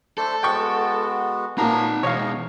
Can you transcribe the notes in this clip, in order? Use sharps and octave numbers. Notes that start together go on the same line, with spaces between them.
A3 D4 A4 C5
G#3 B3 F#4 G5 C#6
A#2 A#3 B3 C#4 D#4 A5 A#5
B2 E3 C#5 D#5 F5 C#6